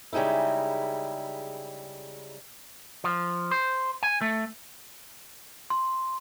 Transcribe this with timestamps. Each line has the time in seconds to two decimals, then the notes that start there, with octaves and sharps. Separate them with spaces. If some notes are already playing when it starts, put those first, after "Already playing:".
0.13 C#3 G3 G#3 D#4 E4
3.04 F3
3.51 C5
4.03 G#5
4.21 A3
5.70 C6